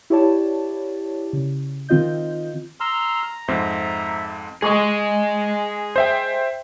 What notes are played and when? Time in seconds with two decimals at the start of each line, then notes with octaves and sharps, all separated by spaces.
0.10 E4 G4 C#5 D5 A5
1.33 C#3
1.89 D#3 C4 F4 D#5 G6
2.80 A#5 C6 E6 F6
3.48 F2 G#2 C4 E5
4.62 G#3 G#4 D#5 C#6 D#6
5.96 C5 E5 G5